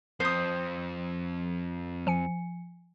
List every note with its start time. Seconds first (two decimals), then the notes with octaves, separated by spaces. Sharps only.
0.20 F2 C5 D#6
2.07 F3 G#5 C#7